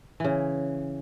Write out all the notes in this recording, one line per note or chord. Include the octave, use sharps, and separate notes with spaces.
C#3 E3